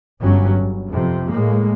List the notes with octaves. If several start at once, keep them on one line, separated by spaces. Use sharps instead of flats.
G1 G2 F#3 C#4
G1
F2 C3
A2 G#3 A#3